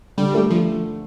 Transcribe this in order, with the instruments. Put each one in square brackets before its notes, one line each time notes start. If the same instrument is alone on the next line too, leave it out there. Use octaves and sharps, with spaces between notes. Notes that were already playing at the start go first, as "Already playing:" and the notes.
[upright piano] D3 [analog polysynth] G3
[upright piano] A3
[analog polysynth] F3